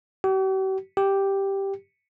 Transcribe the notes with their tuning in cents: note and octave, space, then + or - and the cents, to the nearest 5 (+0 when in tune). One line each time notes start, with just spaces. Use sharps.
G4 -45
G4 +0